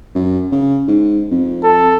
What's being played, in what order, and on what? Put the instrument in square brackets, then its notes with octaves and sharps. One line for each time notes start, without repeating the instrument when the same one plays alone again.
[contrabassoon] F#2
C#3
G#2
F2
[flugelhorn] A4